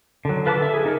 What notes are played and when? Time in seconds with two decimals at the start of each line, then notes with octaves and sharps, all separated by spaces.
0.25 D3 F#3
0.46 F4 B4 A5 A#5 D6
0.58 A4 E5
0.74 G#4
0.86 D#4 A#4